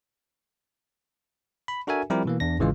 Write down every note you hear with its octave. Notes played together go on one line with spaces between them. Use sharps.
B5
D4 F#4 A4 A#4 E5 G#5
F3 G3 C4 E4 G4 A#4
B2 E3 A#3
E2 D4 A#6
G#1 C#3 E3 G#3 F4